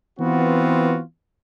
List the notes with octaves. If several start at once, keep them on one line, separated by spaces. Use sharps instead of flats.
E3 B3 C4 F4 F#4